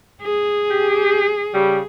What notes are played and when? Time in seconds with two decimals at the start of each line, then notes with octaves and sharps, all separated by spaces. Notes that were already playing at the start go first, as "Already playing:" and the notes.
0.22 G#4
0.70 G4
1.54 C#3 G3 G4